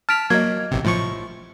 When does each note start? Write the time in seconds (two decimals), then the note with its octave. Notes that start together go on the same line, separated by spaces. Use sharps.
0.09 A5 F6 B6 D7 F7
0.30 F#3 A#3 D#5 F6 G#6
0.71 A1 C3
0.85 A2 F3 C#6